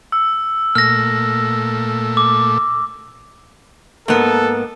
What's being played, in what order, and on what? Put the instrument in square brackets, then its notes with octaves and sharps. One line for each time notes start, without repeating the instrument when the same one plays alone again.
[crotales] E6
[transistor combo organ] A#2 A3 [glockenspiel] F6 A#6
[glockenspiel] D6
[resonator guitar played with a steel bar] G#2 B3 [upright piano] A#3 [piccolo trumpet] A4